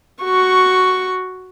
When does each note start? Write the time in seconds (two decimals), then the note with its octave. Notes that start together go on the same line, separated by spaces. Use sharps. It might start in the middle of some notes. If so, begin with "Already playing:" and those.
0.23 F#4 C#6